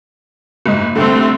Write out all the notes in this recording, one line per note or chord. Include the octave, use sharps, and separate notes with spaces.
F#1 G#2 D#5
C2 D3 A3 C4